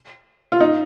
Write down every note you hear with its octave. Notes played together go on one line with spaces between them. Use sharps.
F4
D#4